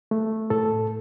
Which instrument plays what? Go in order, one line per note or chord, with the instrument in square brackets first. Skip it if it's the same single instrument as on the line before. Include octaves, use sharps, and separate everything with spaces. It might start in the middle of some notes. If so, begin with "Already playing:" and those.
[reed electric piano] A3
A2 A4